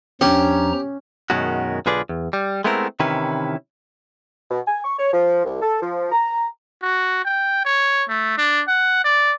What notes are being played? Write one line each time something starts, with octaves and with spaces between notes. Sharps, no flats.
E2 F3 C#4 D4 G4 A#5
F#2 B2 D#3 G#3 C#4 F#4
B1 D3 F4 G#4 B4 D5
E2
G3
G#3 A3 B3 C4 E4 A#4
C3 D#3 E3 C#4 E4 B4
B2
G#5
C#6
C#5
F3
C2
A4
F3
A#5
F#4
G5
C#5
A3
D4
F#5
D5